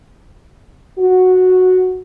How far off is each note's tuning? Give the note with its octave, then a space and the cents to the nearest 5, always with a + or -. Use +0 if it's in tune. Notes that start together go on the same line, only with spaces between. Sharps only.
F#4 -5